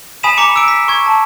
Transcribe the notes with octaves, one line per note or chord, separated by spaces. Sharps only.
G#5 B5 D#6 B6 D#7 E7
A#5 B5 D6 C#7
D6 E6 D7
B6
C#6 G#6
A5